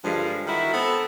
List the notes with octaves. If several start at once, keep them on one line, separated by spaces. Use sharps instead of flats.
G2 D3 F3 G#3
D#3 E4 F#4
B3 C4 A4